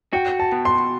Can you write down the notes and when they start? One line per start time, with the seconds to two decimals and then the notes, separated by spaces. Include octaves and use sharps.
0.13 F#4 G5
0.40 A5
0.52 B2
0.65 C6